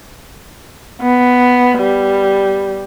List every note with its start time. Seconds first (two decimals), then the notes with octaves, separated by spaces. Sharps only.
1.01 B3
1.78 G3